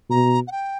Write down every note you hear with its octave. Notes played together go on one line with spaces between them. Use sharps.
B2 A#5
F#5
G5